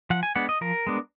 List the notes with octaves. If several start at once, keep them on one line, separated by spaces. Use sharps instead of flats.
F3 F#5
G#5
G#3 B3 D4 F#5
D#5
F3 A#4
G#3 B3 D4